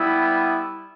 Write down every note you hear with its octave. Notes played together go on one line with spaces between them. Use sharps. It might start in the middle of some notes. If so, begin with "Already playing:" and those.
Already playing: G3 B3 E4